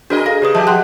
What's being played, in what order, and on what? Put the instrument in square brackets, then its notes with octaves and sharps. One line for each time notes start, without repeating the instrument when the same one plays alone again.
[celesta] D4 F#4 [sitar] G#4 A#4 D#5
[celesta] A4 F5 A#6
[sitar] C#3 [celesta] G4 B4 D#6
[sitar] F3 G4 [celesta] D#5 E5 A5
[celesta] F#5 C6 F#6